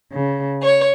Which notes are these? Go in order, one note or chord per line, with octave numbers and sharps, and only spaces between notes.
C#3
C#5